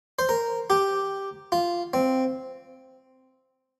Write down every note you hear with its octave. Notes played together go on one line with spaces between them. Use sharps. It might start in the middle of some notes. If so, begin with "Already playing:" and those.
C5
A#4
G4
F4
C4